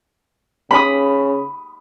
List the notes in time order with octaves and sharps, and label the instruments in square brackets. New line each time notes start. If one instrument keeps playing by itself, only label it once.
[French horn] C#3 [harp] B5 D#6